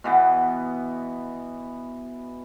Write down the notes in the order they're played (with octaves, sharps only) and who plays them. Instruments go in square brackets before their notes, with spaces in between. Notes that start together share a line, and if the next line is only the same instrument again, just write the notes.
[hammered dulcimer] B2 E3 B3